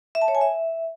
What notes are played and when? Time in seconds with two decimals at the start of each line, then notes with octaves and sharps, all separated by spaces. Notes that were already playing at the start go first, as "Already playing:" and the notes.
0.15 E5
0.22 A5
0.28 C#5
0.35 G#5
0.41 E5